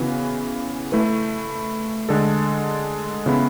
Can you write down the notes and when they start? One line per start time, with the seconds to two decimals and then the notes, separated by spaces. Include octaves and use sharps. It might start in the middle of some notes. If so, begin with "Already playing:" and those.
Already playing: C#3 E3 B3 F#4 B4
0.92 A3 E4 B4
2.09 D3 G#3 D4 A4
3.26 C#3 E3 B3 E4